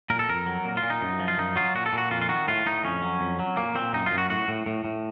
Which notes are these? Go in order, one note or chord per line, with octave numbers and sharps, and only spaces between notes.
A#2 A#4
A4
F2 A#4
F#3
A#2
F4
A#2
D#4
F#2
F3
F4
F#2 D#4
F#3 F4
A#2 F#4
A4
A#2
F#4
F2 F4
F4
D#3 F#4
A2 F4
A2 D#4
F2 C#4
F#3
F2
F#3
A#2 A#3
A#2 C4
F#2 D#4
F#2 F4
F#4
A2 F#4
A2
A2
A2